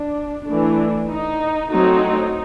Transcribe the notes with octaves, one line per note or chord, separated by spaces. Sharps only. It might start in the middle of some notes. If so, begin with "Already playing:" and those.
Already playing: D4
E3 A3 D4
D#4
F#3 A3 C4 D#4